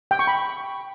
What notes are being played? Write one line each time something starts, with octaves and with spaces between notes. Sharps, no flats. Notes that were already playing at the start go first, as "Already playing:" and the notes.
G5
C#6
B5